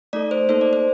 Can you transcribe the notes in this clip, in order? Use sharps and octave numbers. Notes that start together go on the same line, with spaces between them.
A3 D#4 A4 D5
C5
A#3 D#4 A4 C5
D5
C5